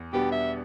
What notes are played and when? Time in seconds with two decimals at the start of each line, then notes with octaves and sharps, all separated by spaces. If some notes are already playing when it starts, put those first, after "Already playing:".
Already playing: E2
0.13 B2 G3 B3 D4 G4
0.32 E5